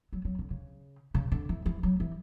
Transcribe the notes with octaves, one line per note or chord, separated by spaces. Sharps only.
F#3
F#3
D3
C#3
C#3
D3
E3
E3
F#3
E3